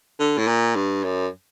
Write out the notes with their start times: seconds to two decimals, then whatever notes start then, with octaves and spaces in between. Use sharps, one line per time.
0.20 D3
0.38 A2
0.47 A#2
0.76 G2
1.04 F#2